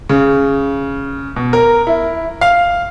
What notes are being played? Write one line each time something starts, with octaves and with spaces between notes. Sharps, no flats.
C#3
B2
A#4
E4
F5